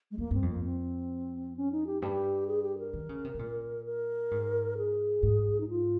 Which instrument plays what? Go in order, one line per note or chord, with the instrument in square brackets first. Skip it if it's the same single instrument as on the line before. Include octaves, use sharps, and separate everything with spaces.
[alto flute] G#3
[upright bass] F2 [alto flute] A#3
[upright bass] G2 [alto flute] C4
[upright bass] F2
[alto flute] A#3
C4
C#4
D#4
G4
[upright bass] G2 [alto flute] G4
[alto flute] G#4
G4
A#4
[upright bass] D#3
C#3
C3
C3
A#2
[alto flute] A#4
[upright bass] G#2
[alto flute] G#4
[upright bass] G#2
[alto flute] D#4
F4